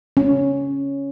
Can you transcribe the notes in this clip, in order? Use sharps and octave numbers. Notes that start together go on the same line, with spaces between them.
C#4